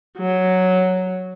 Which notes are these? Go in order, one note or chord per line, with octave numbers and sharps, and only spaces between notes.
F#3